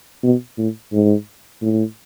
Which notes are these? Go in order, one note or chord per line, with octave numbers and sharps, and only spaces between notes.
B2
A2
G#2
A2